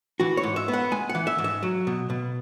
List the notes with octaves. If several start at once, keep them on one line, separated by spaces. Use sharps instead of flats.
E3 F#4
C#5
G#2
E5
B3
F#5
G#3 G#5
F#5
E3
E5
G#2
E5
F#3
B2
B2